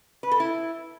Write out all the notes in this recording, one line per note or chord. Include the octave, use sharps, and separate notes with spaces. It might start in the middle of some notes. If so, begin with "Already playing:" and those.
B4
A4
E4